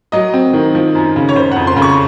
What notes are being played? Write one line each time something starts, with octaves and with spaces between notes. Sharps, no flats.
F#3 D#5
C4
D#3
F3
F#2
C#3
C#5
C#3 C5
F2 F#5
C6
C#3
C#6